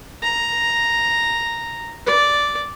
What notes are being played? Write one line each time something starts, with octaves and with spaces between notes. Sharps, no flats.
A#5
D5